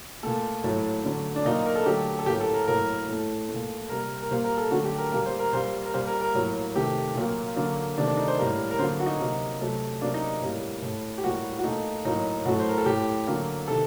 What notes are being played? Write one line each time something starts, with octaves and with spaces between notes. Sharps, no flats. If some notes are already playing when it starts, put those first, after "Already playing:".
A#2 A3 A4
A2 F#3 A3
D3 F#3 A3
D4
A#2 F#3 A#3 D#4
A#4
A4
D3 F#3 A3 G4
A4
A2 F#3 A#3 G4
A4
A#4
A2 F#3 A#3 A#4
A2 A3
A3
A#2
C3 G3 A#3 A#4
A#4
A#2 G3 A#3 C5
A#4
A4
D3 F#3 A3 F#4
G4
A#4
A#2 G3 A#3 A#4
C5
A#4
A#2 G3 A#3 C5
A#4
A#2 G3 A#3 C5
A#4
A#4
A2 F#3 A#3
C3 D#3 A3 G4
A#2 F#3 A#3
D3 F#3 A#3
C3 D#3 A3 D4
D4
D#4
C5
A2 G3 A#3 A#4
A#4
D3 F#3 A#3 C5
F#4
D#4
C3 F#3 A#3
C3 F#3 A3
C3 F#3 A#3 D4
D#4
A2 G3 A#3
A2 A3
G4
A2 G3 A#3 F#4
F#4
A#2 A3 D#4
A2 F#3 A#3 D#4
A2 F#3 A3 F#4
C5
A#4
A4
A2 A3 G4
D3 F#3 A#3
C3 D#3 A4